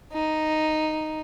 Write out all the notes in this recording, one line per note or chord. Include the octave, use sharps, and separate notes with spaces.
D#4